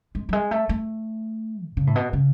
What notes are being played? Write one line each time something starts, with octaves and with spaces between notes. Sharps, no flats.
G#3
F#3
G#3
A3
A3
B2
C#3
A2
B2
C#3